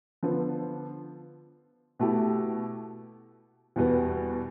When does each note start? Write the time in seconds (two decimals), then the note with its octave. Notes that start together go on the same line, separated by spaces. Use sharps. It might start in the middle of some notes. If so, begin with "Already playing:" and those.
0.23 D3 F3 B3
1.99 B2 A3 E4 G4
3.76 E2 B2 G3 B3